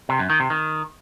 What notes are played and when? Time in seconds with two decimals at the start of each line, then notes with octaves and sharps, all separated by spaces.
0.09 C3
0.19 F#2
0.30 D#3
0.40 C3
0.50 D#3